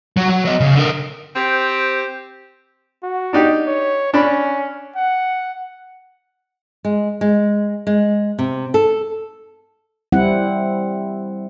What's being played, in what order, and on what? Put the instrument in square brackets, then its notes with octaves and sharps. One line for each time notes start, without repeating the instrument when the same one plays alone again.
[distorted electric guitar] F#3
F#3
F#3 D#5
C#3
D3 A#4
[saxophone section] C4 G4 C5
[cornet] F#4
[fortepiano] D4 D#4 G4
[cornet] C#5
[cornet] C#4 [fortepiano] D4 B5
[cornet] F#5
[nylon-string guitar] G#3
G#3
G#3
C3
A4
[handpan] G3 C4 E4 F#5